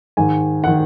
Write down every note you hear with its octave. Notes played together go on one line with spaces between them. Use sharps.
G#2 D#3 G#5
D#3 F#5